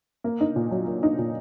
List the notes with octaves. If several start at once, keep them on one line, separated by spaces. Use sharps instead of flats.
A#3
D#4
A#2
F#3
A#3
D#4
A#2